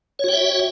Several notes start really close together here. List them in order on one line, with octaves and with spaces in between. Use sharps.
C#5 F#4 G5 E5